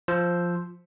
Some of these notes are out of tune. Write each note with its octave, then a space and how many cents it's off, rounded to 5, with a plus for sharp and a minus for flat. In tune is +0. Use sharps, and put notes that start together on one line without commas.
F3 +0 C5 +0 E6 +0